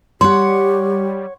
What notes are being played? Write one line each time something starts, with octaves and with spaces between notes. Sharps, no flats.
G3 G4 C#5 F#5 C6